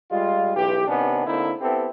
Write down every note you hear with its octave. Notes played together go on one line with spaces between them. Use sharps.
G3 G#3 F4
B1 E3 G4
C3 D#3 B3 C#4 D4
D3 A#3 C4 D#4 E4
B3 C4 E4 G4 A4